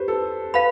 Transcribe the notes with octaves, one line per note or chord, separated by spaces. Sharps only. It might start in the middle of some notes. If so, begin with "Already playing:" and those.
Already playing: G4 B4 C5
A4
B4 F5 B5